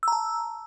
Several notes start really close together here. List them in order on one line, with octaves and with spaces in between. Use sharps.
E6 A#5 A5